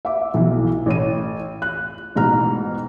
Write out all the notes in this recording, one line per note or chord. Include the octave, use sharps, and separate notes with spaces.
E5 D6
B1 B2 E3
A1 C#5 D#7
F#6
A1 G#2 B2 A#5 F6